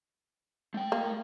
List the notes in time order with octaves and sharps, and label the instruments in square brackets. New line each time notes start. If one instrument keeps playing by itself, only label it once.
[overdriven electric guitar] A3 G5
[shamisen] A#3